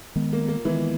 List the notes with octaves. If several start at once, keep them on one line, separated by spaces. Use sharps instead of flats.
D#3 G#3 B3
A#3
A#3
D#3 E3 G#3 B3